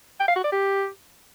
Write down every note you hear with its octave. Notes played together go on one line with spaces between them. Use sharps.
G5
F5
F#4
D5
G4